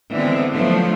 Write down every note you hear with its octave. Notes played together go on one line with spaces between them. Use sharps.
D3 E3 G#3 B3 C4
F3 F#3 A3 B3 D4